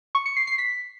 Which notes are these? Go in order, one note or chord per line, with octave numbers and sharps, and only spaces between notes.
C#6
C#7
C7
C7
B6